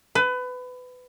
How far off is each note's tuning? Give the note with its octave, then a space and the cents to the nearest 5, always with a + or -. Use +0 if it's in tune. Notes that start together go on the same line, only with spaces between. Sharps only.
B4 +25